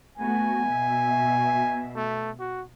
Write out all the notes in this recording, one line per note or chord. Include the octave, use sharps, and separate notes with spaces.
A3 B3 F#4 G#5
B2 E5
A3
F#4